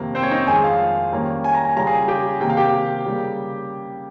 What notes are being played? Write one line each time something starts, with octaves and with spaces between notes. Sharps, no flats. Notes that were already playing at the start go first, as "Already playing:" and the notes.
Already playing: F2 C3 D#3 A#3
C4 C5
C#4 C#5
D#4 D#5
F2 D#3 G#3 G#4 G#5
F4 F5
D#3 G3 A#3 C#4
G#5
A#5
G#5
C#3 G3 C#4 F4 A#5
G#4 G#5
G4 G5
C3 D#3 A#3 G5
F5
G4 G5
C#3 G3 A#3